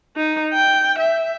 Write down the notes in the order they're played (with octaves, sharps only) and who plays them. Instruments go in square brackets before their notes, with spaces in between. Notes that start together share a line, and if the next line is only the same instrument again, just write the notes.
[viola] D#4
G5
E5